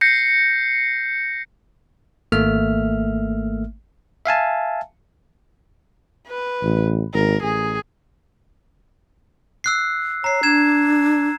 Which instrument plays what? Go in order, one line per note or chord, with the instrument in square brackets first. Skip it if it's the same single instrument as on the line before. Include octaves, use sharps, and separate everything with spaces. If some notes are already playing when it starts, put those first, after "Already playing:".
[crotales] G6 A#6 C7 C#7
[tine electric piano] G#1 A3 A#3 E5 F6
E5 F5 G#5 A5
[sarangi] B4
[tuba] A1
[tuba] G#1 [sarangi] A#4
[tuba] A1 [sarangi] G#4
[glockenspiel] E6 F#6 C7
[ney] C#5 [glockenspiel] A#5 C7
[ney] D4 [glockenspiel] G#6 E7